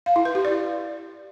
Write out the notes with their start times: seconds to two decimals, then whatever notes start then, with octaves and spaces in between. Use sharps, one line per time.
0.06 F5
0.16 E4
0.25 B4
0.35 G4
0.45 D5